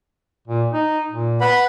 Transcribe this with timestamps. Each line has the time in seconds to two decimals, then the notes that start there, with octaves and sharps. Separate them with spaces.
0.48 A#2
0.73 D#4
1.10 A#2
1.41 B4 F#5 B5